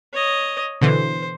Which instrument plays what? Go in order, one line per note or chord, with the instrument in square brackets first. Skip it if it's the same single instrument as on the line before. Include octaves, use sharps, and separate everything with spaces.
[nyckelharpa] C#5 D#5
[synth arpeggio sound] B2 D3 E3 [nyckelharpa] C5